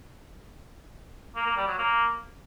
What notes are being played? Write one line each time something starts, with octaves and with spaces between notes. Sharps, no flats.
A#3
A#3
G3
F#3
A#3